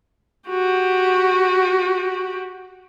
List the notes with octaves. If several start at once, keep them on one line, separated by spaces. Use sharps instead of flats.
F#4 G4